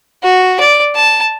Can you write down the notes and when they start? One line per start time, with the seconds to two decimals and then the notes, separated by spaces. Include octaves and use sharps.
0.23 F#4
0.60 D5
0.95 A5